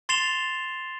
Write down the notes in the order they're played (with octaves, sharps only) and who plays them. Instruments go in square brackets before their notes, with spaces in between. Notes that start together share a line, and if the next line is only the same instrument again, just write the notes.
[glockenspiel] C6 A6 C7 E7 F7 G7